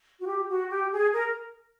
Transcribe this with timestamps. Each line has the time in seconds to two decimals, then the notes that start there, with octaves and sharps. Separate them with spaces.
0.20 F#4
0.25 G4
0.47 F#4
0.69 G4
0.91 G#4
1.13 A#4